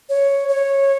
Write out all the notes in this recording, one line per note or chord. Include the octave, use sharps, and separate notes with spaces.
C#5
C#5